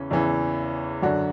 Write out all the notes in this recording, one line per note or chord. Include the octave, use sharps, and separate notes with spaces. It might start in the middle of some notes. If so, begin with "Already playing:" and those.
Already playing: E2 C#3 E3 C#4
E2 C#3 E3
F#2 D3 D4 F#4